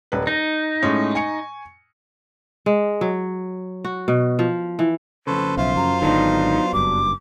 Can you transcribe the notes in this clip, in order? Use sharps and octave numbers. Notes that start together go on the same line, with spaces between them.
D#1 B4
D#4 A#6
A2 G#3 C#4
G#5 C#6 C#7
G#3
F#3
F#4
B2
F3
E3
F2 C#3 A4 B4 C5
B1 F4 C5 E5 F5
F#2 A#5
G#1 D3 F#3 B3 D4 D#4
F#1 G2 D6